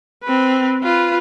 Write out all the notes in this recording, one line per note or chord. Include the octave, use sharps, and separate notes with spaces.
C4 B4
F4 B4